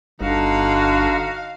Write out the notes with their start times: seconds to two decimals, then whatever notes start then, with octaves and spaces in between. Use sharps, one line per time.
0.21 G1 D3 D#4 F#4 F5